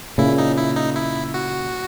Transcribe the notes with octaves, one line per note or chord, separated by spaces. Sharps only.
A#2 C#3 E4
D#4
E4
D#4
E4
F#4